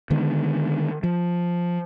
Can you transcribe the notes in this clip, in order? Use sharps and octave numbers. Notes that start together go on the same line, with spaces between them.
D3 D#3 G#3 B3
F3